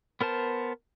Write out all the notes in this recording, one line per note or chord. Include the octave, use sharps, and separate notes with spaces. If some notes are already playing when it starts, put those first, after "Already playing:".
B3 A#4 C5 A5